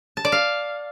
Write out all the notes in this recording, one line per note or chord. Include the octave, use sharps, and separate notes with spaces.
A5
D5
F5